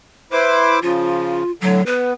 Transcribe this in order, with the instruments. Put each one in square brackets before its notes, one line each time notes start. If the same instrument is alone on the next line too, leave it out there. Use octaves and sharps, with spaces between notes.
[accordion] E4 C5 D6 [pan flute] B4
[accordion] C#3 F3 [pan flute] F4
[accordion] A2 D3 [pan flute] F#3
[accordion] B3 [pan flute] B4